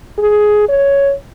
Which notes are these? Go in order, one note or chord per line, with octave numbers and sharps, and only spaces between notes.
G#4
C#5